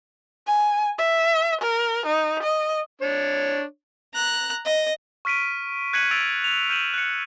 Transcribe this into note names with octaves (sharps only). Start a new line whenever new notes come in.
G#5
E5
A#4
D#4
D#5
D4 C#5
A#5 F#6
D#5
C#6 F6 B6 D7 D#7
F#6 G#6 B6 C#7 D#7 F#7
E6 A6 D7 D#7 F7
F7
F6 G6 D#7 E7 F#7
F#6 C#7